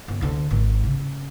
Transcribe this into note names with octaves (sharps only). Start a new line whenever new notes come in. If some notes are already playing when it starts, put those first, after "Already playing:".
G1
D2 D3
G#1
C#3